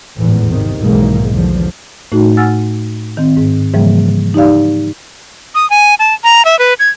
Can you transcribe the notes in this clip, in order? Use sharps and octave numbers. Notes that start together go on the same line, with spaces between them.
G#1 E2 A2 E3
G#1 C3 D#3
B1 G#2 D#3 E3 G#3 A#3
B1 E2 D3 F3
A2 A3 D#4 F#4
F#5 G#5 E6 F6 A6
D#3 C4
G#2
G#2 C#3 E3 F3 G3 A#3
D#4 G4 D5 F5
D#6
G#5
A5
A#5
E5
B4
G#6